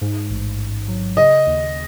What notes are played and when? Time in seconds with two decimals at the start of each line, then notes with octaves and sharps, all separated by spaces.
0.01 G#2
0.30 A1
0.59 A1
0.88 F#3
1.17 C#3 D#5
1.46 D#2